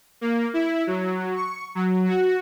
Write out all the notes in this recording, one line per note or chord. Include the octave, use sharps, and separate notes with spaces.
A#3
E4
F#3
C#6
F#3
F#4